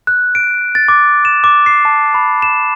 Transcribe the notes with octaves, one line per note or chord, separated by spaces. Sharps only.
F#6
D7
A6
D6
E7
D6
C7
A5
B5
E7